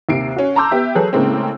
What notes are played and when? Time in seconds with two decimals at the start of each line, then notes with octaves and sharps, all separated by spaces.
0.09 D#2 C3 C7 D7
0.36 C#4 F#4
0.56 A5 A#5 C6 D6 E6 G6
0.71 B3 G4 E5
0.95 F#3 G#4 A4 B4
1.13 A2 C#3 G#3 A#3 C4